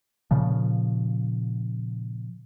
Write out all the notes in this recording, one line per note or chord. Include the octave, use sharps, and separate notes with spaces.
A#2 C#3 F3